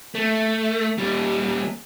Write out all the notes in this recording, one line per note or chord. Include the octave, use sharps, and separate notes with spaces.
A3
D#2 G3